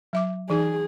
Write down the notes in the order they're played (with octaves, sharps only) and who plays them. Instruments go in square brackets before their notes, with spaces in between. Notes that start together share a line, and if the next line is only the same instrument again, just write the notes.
[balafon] F#3 E5 D6
[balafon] E3 D#4 [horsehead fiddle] G#4